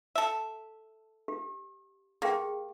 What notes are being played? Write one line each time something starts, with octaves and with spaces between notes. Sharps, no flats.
A4 E5
G4
A#3 G4 G#4 G5